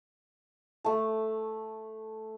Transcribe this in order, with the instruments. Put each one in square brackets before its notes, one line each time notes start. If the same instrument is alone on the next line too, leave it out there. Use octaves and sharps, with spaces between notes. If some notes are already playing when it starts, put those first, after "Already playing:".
[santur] A3 A5